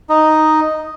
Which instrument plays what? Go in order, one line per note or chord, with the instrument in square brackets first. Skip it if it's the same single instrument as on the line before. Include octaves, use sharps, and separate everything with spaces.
[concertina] D#4